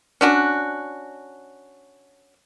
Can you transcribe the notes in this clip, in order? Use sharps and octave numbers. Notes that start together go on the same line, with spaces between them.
C#4 D4 F#4